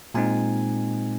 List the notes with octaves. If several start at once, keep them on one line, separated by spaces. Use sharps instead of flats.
A#2 G#3 C4 D#4 G#5